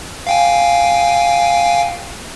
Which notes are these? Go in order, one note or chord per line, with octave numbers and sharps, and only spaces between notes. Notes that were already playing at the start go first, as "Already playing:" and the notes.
F5 G5 G#5